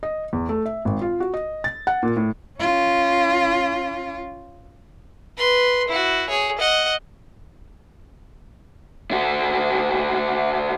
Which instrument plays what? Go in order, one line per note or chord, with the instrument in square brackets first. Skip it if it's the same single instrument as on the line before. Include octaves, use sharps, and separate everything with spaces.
[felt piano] D#5
E2
A3
E5
G#1
F4
F#4
D#5
A6
F#5
A#2
A2
[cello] C#4 F4
[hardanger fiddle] B4 C6
E4 F#4
G#4 C#5
D#5 F#5
[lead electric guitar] D3 F#4